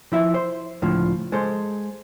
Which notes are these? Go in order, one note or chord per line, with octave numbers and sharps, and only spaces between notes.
F3 E4 E5
C5
C#2 A2 D3 F3
G#3 A4 C5